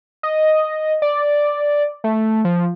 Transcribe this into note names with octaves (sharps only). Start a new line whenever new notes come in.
D#5
D5
A3
F3